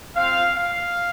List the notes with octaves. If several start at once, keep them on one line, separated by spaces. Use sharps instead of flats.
C4 F4 F5
F5